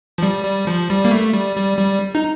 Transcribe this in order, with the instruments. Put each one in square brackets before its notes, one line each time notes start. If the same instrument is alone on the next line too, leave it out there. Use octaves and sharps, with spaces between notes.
[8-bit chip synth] F3
G3
G3
F3
G3
A#3
A3
G3
G3
G3
D#4